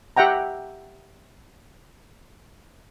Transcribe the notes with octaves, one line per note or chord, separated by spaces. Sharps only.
G4 E5 F#5 G5 A#5